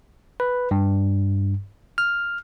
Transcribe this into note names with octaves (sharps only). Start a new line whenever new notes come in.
B4
G2
F6